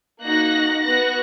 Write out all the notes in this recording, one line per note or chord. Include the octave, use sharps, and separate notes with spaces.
A#3 D#4 F#4 F#6 A#6
B3 F#4 F#6 A#6